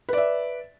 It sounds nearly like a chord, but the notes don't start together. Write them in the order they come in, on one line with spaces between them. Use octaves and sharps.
B4 D5 E5